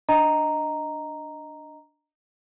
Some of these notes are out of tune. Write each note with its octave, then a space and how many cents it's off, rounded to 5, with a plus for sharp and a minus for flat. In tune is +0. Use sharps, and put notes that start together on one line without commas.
D4 +0 D#5 +0 A#5 +0